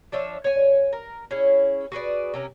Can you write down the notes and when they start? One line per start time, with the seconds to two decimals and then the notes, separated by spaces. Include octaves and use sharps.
0.12 F3 D4 C#5 E5
0.44 C#5 G#5
0.93 A#4
1.31 C#4 E4 G#4
1.92 F#4 G#4 B4 D5
2.34 C3 C#4 A#4